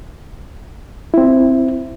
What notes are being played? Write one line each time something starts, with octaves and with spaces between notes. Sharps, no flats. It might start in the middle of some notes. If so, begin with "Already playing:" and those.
C4 E4